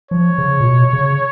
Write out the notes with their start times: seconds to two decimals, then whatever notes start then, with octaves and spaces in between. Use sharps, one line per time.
0.11 F3 C#5
0.38 C#3
0.60 A#2
0.65 B2
0.93 C#3